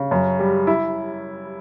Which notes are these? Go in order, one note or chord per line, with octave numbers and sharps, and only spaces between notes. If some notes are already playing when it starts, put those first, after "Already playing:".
Already playing: C#3
F#2
G3
E4